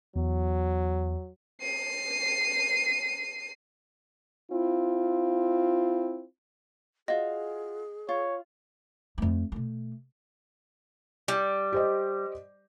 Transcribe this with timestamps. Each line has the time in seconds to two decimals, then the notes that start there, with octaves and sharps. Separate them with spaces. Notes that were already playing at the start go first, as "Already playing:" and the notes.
0.16 E2 F#3
1.61 C7 D#7
4.52 C4 E4 F4
7.08 F4 F#4 G#4 D#5
8.09 F4 C#5
9.18 F2 A3
9.52 B2 A3
11.28 G3
11.73 G4 C5 D#5